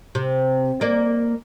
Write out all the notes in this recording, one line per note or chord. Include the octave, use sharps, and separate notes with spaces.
C3
A#3 D5